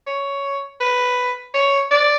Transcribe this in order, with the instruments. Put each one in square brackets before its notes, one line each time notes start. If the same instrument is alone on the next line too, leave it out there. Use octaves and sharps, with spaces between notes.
[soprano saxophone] C#5
B4
C#5
D5